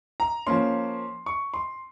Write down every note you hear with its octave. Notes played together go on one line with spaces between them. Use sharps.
A#5
F3 A#3 C#4 C6
C#6
C6